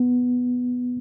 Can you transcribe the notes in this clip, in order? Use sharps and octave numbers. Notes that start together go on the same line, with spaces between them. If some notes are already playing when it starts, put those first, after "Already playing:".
Already playing: B3